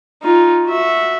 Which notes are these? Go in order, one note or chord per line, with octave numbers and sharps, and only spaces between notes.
D#4 F4
F#4 E5